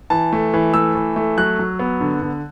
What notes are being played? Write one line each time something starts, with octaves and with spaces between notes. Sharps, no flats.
E3 A5
A3
E3
A3 E6
E3
A3
F#3 F#6
F#3
B3
D3
D3